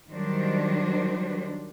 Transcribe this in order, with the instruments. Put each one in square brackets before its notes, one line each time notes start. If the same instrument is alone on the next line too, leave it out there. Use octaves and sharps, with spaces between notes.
[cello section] D#3 F#3 G3 D4 C5